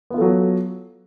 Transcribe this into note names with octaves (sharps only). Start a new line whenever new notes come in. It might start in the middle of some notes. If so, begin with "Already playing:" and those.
F#3 B3 F4 A4